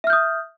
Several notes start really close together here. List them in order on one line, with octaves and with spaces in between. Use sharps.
E5 F6 G6 D#6